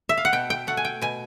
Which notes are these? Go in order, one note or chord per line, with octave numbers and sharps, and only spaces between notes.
E5
F5
F#5
B2 G5
G5
A3 F#5
G#5
G5
B2 G#5